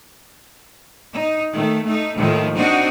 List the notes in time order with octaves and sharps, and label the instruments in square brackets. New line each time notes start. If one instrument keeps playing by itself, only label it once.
[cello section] D#4
D#3 A3
A3 D#4
D#2 A2 D#3 F3 A3
C4 D4 D#4 F#4 D#5